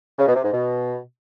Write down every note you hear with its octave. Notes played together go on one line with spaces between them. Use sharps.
C#3
B2
C3
G#2
B2